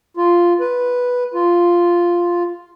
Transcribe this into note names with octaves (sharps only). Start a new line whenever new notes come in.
F4
B4
F4